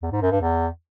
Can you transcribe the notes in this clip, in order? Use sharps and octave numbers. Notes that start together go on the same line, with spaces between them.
E2
G#2
F#2
G2
E2